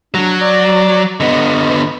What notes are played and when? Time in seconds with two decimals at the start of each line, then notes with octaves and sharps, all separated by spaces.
0.14 F#3 D4
0.41 D5
1.20 D3 B3 D#5